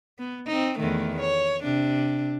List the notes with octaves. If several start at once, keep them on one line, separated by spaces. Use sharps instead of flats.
B3
C4 D#4
E2 D#3 A3
C#5
C3 D4